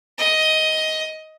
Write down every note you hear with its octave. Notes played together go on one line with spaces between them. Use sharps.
D#5